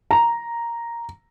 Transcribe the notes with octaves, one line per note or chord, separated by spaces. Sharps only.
A#5